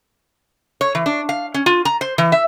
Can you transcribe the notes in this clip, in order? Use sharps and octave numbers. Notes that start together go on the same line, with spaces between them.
C#5
E3
D4
F5
C#4
F4
A#5
C5
E3
E5